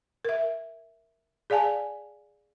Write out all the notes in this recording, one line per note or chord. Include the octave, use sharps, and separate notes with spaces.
A#4 E5
G#4 D5 F5 G#5 A5